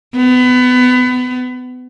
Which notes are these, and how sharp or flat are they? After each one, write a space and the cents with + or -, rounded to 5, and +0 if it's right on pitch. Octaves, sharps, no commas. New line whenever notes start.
B3 +25